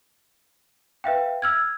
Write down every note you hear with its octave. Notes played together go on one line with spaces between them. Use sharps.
B4 E5 F5 G5
E6 F6 G#6